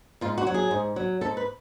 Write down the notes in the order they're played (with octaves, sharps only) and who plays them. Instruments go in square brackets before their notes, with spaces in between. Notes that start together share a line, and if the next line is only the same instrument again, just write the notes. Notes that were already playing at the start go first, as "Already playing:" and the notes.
[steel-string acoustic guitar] G#2 F4
F#4
F#3
G#4
G#2
F#3
G#2 A4
B4